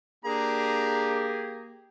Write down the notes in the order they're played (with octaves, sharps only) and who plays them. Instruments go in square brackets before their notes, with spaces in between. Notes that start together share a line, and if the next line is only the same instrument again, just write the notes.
[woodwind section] A#3 G#4 [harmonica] D4 A#5 [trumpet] G4